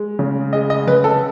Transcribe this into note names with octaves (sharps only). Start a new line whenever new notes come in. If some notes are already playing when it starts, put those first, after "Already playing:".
Already playing: G#3
C#3
G#3 D#5
D#5
C#3 B4
A4